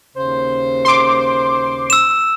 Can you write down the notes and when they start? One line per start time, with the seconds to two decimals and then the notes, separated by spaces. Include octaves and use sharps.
0.16 D#2 C#3 C5
0.85 C6 D6
1.90 E6 E7